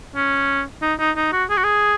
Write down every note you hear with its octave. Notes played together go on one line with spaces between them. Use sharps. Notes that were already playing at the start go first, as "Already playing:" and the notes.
C#4
D#4
D#4
D#4
F#4
G#4
F#4
G#4